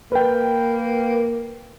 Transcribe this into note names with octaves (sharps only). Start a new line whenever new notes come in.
A#3 B4 G5